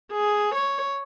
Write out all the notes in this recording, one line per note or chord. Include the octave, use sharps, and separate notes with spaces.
G#4
C#5